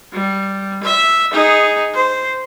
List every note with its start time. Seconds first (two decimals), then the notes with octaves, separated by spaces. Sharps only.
0.12 G3
0.84 E5
1.32 D#4 G#4
1.94 C5